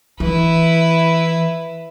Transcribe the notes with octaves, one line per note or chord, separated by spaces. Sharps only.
E3 E4 B4